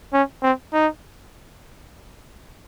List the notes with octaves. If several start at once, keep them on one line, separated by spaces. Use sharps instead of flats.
C#4
C4
D#4